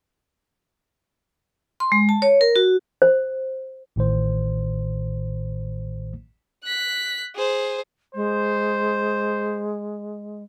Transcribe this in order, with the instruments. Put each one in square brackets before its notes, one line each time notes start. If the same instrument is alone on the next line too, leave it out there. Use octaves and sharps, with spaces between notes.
[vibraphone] C6
G#3
A5
C#5
A#4
F#4
[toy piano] C5
[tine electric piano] A1 A2 D#3 C5
[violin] F#6 B6
G#4 C5
[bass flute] G#3 [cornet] C5